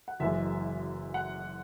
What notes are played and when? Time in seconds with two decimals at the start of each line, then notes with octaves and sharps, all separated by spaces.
0.08 F#5
0.20 F#1 F#2 E3 G#3 E5
1.14 F#5